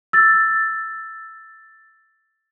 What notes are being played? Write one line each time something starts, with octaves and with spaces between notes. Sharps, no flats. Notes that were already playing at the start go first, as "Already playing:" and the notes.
E6 A6